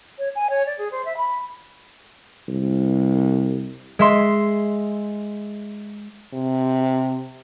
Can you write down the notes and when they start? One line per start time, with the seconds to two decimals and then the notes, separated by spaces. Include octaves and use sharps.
0.19 C#5
0.36 G#5
0.50 C#5
0.66 D5
0.78 G#4
0.91 C5
1.05 E5
1.17 B5
2.48 C2
3.99 G#3 E5 C6
6.34 C3